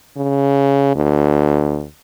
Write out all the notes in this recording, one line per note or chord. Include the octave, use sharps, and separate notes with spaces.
C#3
D2